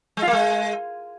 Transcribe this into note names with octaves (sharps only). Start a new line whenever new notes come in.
G#3
F4
A#3
G#3